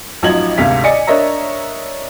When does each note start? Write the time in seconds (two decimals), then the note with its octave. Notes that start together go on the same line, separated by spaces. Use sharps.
0.23 A1 F3 F#3 D#4 G#6 F#7
0.58 G#1 D2 C3 F5 B6
0.84 D5 D#5 G#5 C#7
1.07 D4 A#4 C#5 D#5 E5 A#5